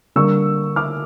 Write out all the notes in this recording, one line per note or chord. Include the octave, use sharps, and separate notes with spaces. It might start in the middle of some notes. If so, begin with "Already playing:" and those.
D3 G3 A#3 D4 C#6 E6
D6 F6